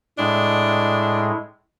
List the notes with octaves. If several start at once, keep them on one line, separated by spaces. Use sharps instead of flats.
A2 G#3 D4